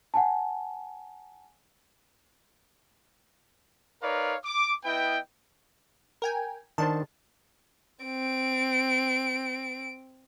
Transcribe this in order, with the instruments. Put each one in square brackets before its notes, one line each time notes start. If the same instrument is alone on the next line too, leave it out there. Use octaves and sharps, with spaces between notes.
[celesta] F#5 G#5 A5
[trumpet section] D#4 A#4 B4 C#5 D5 F5
D6
B3 E4 B4 D#5 G5
[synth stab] A#4 G5 G#5
[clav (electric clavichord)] D#3 D4 C5 [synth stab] A5
[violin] C4 D7